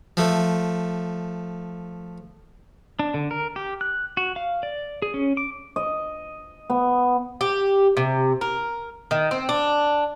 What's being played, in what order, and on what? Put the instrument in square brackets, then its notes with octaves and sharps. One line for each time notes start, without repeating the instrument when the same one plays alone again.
[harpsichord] F3 A3
[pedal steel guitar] D4
D3
A#4
G4
F#6
F#4
F5
D5
G#4
C#4
D6
[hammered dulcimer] D#5
B3
[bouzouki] G4
C3
A#4
D#3
C4
D4